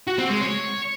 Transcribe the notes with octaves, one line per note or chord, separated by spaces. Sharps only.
F#4
C4
G#3
C#5